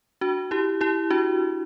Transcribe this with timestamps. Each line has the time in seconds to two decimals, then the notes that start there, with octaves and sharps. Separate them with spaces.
0.21 D4 F#4
0.51 E4 G4
0.81 E4 G4
1.10 D4 F#4